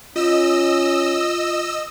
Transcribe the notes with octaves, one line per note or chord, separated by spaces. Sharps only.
C#4 F4 D#5 E6